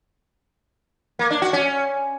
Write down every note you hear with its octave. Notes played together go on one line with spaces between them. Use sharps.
A#3
D4
F#4
C#4